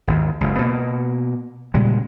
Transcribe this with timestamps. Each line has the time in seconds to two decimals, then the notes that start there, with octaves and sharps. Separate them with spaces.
0.07 G#1 D#2
0.41 F#1 C#2
0.59 B2 A#3
1.74 A#2 C#3 G3 G#3